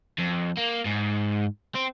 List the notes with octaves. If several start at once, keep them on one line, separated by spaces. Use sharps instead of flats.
F2
A#3
G#2
C4